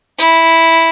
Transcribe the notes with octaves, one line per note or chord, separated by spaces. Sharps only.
E4